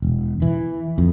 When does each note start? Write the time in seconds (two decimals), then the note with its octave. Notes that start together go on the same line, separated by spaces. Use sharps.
0.02 E1
0.42 E3
0.98 F2